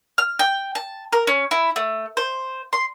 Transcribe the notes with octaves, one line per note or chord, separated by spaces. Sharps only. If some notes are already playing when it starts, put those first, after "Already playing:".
F6
G5
A5
A#4
C#4
E4
A3
C5
C6